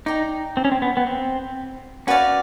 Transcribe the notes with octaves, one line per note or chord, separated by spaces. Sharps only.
D#4 D5 G5 A#5
C4
C#4
C4
B3
B3
C4
C#4 F#4 B4 D5 F5